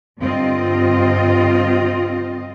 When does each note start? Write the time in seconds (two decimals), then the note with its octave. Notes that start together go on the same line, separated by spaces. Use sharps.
0.19 G2 D3 C4 F4 D#5